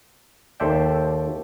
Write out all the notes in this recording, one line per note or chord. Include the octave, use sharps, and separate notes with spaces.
D#2 A4 C5 D5 E5 G5